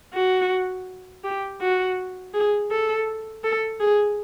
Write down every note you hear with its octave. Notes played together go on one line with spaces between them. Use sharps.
F#4
G4
F#4
G#4
A4
A4
G#4